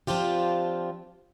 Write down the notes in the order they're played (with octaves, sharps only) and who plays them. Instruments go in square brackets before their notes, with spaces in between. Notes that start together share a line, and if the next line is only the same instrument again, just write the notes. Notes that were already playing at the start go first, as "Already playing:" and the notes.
[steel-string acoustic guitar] F3 C4 D4 F4 G4